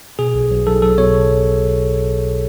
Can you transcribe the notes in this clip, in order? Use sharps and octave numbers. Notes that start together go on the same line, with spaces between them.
B2 G#4
B1
B1
B1 A4
F#3 A4
B2 C#5